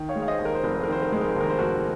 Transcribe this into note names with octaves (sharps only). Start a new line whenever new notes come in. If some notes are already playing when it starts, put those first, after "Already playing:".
Already playing: D#3
C#5 F5
G#3
F5
C5 D#5
D#2
A#4
C5
F1 A#4
C5
A#4
D#3 C5
A#4
G#3 C5
A#4
C5
D#2 A#4
C5
F1 F#4 A#4